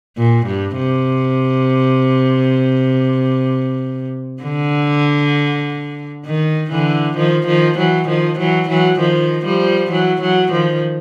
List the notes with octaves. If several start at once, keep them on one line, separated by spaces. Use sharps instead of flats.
A#2
G2
C3
D3
D#3
D3 E3
D#3 F3
D#3 F3
E3 F#3
D#3 F3
E3 F#3
E3 F#3
D#3 F3
F3 G3
E3 F#3
E3 F#3
D#3 F3